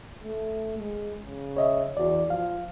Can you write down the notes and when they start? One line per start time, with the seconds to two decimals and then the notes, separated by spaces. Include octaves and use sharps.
0.24 A3
0.78 G#3
1.21 C#3
1.57 C#5 D#5 E5
1.97 E2 F#4 D5
2.30 F3 F5